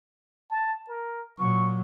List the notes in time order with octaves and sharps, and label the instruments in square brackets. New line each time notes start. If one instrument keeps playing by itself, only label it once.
[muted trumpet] A5
A#4
[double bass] A#2 F#3 [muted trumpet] C#6